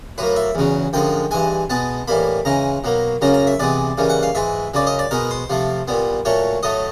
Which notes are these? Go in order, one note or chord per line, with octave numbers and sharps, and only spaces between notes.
A2 F#3 A#3 B4
E5
E2 C#3 F#3
F#2 D3 F3 G#3 G5
G2 E3 G#3 G#5
B2 G#3 B3 A5
A2 E3 G3 A#3 B5
C#3 E3 G#3 A#5
B2 F#3 A#3
F#2 C#3 F#3 A#3 A#5
A#5
E5
C3 E3 G#3 B3 D5
C#3 E3 G3 A#3
F#5
F5
G#2 E3 G#3 E5
F#2 C#3 F#3 D5
D#5
D5
B2 G#3 B3 A#4
C5
C3 F3 A3
A#2 G3 B3
A#2 F#3 A3 C#5
A2 F#3 A3 D#5